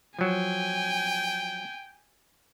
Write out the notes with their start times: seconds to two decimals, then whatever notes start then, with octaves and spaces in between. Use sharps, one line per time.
0.19 F3 F#3 G5 G#5